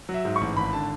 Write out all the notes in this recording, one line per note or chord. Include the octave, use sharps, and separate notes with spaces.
F#3
E5
G#2
C#6
A1
G#1 B5
D3 A5